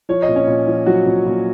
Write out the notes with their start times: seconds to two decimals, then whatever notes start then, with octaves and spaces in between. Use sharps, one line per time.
0.09 F3 C#5
0.22 D#5
0.28 A#2
0.36 C#4 C#5
0.47 A#2
0.67 F3
0.86 F3 F#3 F#4
1.06 A#2
1.26 A#2